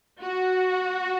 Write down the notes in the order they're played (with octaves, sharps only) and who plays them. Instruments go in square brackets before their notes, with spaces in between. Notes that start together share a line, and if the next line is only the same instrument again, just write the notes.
[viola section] F#4